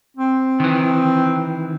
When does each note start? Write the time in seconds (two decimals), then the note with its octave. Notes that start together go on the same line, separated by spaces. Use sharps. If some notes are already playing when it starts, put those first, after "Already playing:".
0.17 C4
0.60 D#3 E3